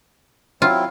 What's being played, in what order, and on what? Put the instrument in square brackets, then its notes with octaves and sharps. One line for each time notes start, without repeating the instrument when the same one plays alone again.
[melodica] F#3 C4 E4 [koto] F4